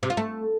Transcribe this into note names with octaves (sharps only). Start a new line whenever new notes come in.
C3
F4
A3